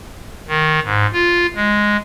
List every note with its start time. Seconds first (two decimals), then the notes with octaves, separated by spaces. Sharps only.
0.48 D#3
0.84 G#2
1.13 F4
1.55 G#3